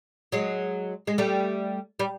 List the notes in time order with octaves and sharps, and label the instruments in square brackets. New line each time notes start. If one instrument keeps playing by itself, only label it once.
[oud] F#3 G#3
G#3
G3 A3
G3